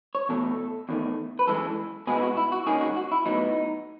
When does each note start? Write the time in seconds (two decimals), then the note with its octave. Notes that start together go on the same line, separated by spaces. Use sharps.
0.15 C#5
0.29 E2 B2 A3 A4
0.89 E2 D#3 A3
1.39 B4
1.47 F#2 E3 G#3 A4
2.07 B2 G#3 B3 G#4
2.17 E4
2.22 F#4
2.37 E4
2.52 F#4
2.67 D#2 D#3 G#3 C#4 G#4
2.81 F#4
2.96 F#4
3.12 E4
3.26 A2 F#3 B3 D#4